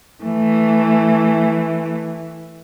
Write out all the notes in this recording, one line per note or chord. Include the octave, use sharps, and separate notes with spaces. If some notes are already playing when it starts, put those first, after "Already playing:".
E3 A3